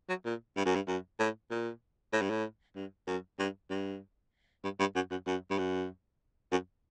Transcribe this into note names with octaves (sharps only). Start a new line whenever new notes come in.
F#3
A#2
G2
F#2
G2
F#2
A2
A#2
A2
G2
A2
G2
F#2
G2
G2
G2
G2
F#2
F#2
F#2
G2
F#2
F#2